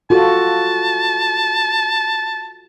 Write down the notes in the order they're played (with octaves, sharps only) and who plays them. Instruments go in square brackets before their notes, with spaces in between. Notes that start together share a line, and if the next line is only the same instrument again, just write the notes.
[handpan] F4 F#4 A4 [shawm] A5